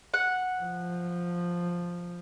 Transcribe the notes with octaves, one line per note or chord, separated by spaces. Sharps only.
F#5
F3